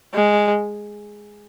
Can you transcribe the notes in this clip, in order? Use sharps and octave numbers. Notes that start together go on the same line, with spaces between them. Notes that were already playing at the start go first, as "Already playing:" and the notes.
G#3